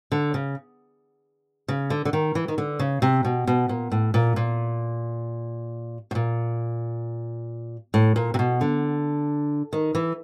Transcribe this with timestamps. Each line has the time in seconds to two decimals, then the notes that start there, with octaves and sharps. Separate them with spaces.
0.12 D3
0.34 C#3
1.68 C#3
1.90 D3
2.05 D3
2.13 D#3
2.35 E3
2.48 D#3
2.58 D3
2.79 C#3
3.02 C3
3.24 B2
3.47 B2
3.69 A#2
3.92 A2
4.14 A#2
4.36 A#2
6.11 B2
6.15 A#2
7.94 A2
8.16 A#2
8.34 C3
8.39 B2
8.61 D3
9.73 D#3
9.95 E3